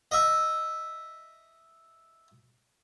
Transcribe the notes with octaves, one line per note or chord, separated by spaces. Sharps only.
D#5 E5